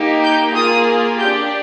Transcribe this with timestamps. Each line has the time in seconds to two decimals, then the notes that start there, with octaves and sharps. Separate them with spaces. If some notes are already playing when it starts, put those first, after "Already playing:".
Already playing: A#3 D#4 G4
0.24 G6
0.54 A#3 F4 G#4 D#6
1.19 D4 G4 G6